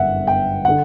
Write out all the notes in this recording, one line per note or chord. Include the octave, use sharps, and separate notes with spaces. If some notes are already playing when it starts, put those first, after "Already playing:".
Already playing: G1 F#2 D3 E5 F#5
G5
D3 F#5